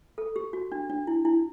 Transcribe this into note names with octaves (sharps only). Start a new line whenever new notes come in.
A4
G4
F#4
D4
D4
E4
E4